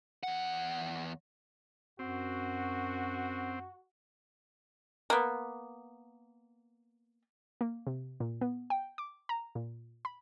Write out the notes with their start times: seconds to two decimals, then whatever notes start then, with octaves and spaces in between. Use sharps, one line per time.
0.23 E2 F#5
1.99 F#2 C4 F#4
5.10 A#3 B3
7.61 A#3
7.87 C3
8.20 A#2
8.41 B3
8.70 G5
8.98 D6
9.29 A#5
9.55 A#2
10.05 B5